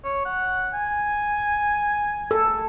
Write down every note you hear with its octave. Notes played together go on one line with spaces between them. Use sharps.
C#5
F#5
G#5
A4